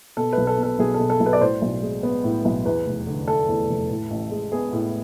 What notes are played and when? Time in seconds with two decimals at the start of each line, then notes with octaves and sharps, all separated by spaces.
0.17 B2 A4
0.32 B4
0.38 B1
0.47 A4
0.58 B3 A4
0.79 B1 G#4
0.94 A4
1.00 B2
1.10 A4
1.20 B1
1.26 B4
1.33 D5
1.41 A2 C5
1.62 B1
1.83 G#3
2.03 B3
2.24 A2
2.45 B1
2.65 E2 B4
2.86 F1
3.07 D3
3.27 A3 A4
3.48 E2
3.69 F1
3.90 A2
4.11 A1
4.31 G#3
4.52 B3 G#4
4.73 A2